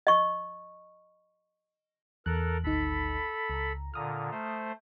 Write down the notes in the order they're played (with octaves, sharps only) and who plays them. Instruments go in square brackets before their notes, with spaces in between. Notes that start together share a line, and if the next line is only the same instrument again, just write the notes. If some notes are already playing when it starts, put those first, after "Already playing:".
[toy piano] D#5 C#6
[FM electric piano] E2 F#6 [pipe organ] A4 A#4
[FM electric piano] G#1 D2 D#4 [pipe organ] A4 B5
[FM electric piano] C#2 A#5
[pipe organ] A#2 D3 [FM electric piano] A#5 D#6 F6
[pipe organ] A3 C5